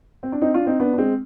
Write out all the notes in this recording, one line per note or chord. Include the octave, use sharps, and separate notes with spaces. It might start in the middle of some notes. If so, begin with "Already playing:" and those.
C4
D4
C4 D#4
D4 F4
C4 D#4
B3 D4
D4
G#3 C4